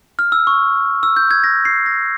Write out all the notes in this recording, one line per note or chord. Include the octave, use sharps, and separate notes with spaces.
F6
E6
C#6
E6
G6
G#6
A#6
C7
A#6